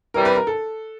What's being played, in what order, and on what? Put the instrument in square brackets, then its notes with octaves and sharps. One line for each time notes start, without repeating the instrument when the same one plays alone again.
[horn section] C3 E3 G3 C4 [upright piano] A#4
[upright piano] B4
A#4
A4